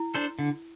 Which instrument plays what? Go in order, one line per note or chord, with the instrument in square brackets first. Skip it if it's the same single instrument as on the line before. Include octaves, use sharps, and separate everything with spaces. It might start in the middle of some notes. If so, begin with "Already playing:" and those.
Already playing: [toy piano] E4
[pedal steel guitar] D4 A4 C5
D3